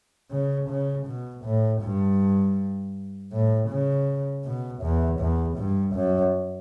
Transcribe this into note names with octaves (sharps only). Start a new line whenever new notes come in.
C#3
C#3
B2
A2
G2
A2
C#3
B2
E2
E2
G2
F#2